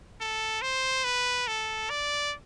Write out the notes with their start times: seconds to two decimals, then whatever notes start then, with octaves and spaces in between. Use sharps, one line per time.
0.21 A4
0.62 C5
1.04 B4
1.47 A4
1.90 D5